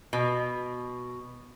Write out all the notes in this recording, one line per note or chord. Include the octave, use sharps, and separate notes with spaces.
B2